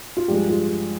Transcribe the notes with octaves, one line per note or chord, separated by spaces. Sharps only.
F4
G2 F3 G#3 G4
F4 G#4